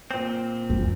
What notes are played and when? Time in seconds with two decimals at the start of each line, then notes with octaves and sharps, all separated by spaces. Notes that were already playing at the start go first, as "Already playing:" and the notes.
0.11 A#2 C4
0.70 F2